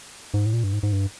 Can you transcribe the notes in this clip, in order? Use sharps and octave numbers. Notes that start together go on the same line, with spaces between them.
G#2
A2
A#2
G2
G#2
G#2
G2